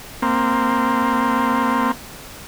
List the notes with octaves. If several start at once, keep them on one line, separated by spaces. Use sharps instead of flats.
A#3 C4